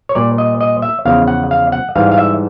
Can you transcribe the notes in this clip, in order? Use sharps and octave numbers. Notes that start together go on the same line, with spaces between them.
C#5
A#2 G3 D5
D#5
D#5
E5
E2 C#3 F3 F5
F#5
F5
F#5
G#2 E3 G3 F5
F5
E5